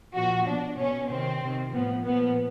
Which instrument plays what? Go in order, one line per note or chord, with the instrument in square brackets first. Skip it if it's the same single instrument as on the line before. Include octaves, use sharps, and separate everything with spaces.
[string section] A#2 F3 F#4
B2 D4
B2 C#4
C3 D#3 C4
C3 D#3
A2 F3 B3
A#2 F3 B3